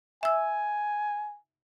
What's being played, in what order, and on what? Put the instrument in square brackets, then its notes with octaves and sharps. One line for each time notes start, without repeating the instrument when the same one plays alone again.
[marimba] E5 E6 [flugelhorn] G#5